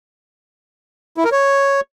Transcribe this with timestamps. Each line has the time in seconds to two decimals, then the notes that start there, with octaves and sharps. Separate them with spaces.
1.17 E4
1.25 A#4
1.32 C#5